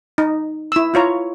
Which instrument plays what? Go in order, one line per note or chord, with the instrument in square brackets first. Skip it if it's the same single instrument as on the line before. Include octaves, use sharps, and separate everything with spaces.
[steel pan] D#4
E4 E6
E4 F4 C#5 A#5